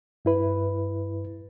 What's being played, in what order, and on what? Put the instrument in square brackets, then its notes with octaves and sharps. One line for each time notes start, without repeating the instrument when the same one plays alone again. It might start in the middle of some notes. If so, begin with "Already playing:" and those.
[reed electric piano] G2 E4 B4